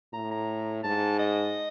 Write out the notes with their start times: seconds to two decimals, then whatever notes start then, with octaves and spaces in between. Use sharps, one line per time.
0.13 A2 A#5
0.31 A#5
0.84 G#2 A5
1.19 D#5